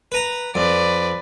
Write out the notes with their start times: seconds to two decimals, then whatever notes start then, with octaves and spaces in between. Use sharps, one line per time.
0.12 B4 A#5
0.55 F2 B4 D5